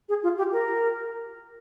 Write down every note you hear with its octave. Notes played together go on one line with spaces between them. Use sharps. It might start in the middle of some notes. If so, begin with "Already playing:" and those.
G#4
F4
G4
A#4